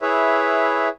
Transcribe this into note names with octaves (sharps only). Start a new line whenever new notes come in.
E4 G#4 B4 C#5 E5